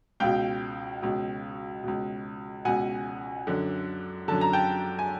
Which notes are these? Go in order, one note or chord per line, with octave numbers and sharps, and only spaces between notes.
C#2 B2 F5 G5
C#2 B2
C#2 B2
C#2 B2 F#5 G#5
F#2 D3
F#2 D3 A5
A#5
G5 A5
G#5